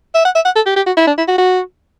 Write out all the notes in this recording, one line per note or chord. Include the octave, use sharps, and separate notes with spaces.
E5
F#5
E5
F#5
A4
G4
G4
F#4
E4
D4
E4
F#4
F#4